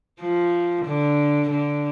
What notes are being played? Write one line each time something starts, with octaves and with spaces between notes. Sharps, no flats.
F3
D3
D3